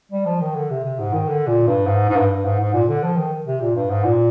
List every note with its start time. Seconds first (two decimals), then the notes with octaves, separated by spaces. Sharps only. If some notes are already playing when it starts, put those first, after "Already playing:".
0.12 G3
0.26 F3
0.41 D#3
0.55 D3
0.70 C3
0.84 C3
0.99 G#2
1.13 D#3
1.28 D3
1.47 A#2
1.67 G2
1.86 G#2
2.09 G#2
2.16 G2
2.45 G#2
2.59 G#2
2.73 A#2
2.88 D3
3.03 F3
3.17 D#3
3.47 C3
3.61 A#2
3.76 G2
3.90 G#2
4.04 A#2